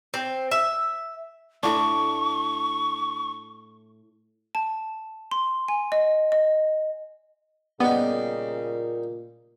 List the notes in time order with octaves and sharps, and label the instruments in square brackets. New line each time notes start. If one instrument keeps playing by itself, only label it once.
[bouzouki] C4
E5
[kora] A2 D4 [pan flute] C#6
[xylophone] A5
C6
G#5
D#5
D#5
[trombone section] A#2 [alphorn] C#3 [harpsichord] G3 D#4 [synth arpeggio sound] B3